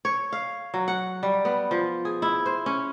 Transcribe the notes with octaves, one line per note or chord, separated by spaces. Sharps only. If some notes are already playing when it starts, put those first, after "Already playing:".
C#5
F5
F#3
F#5
G3
B3
F3
G#4
E4
C5
C#4